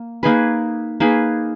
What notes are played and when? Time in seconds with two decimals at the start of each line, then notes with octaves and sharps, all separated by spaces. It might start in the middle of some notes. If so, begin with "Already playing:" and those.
Already playing: A#3
0.23 A#3 D#4 G#4 B4
1.00 A#3 D#4 G#4 B4